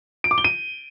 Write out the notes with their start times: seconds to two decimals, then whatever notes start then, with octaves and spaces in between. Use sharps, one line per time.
0.24 D7
0.31 D6
0.38 G7
0.44 D#7